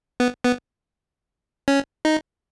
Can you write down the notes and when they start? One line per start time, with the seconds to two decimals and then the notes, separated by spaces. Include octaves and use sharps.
0.20 B3
0.44 B3
1.68 C#4
2.05 D#4